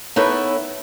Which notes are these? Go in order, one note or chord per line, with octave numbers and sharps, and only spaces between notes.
B3 D#4 E4 A4 B4 C#5